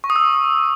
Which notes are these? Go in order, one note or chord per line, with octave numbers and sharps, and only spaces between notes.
C#6
D#6
E6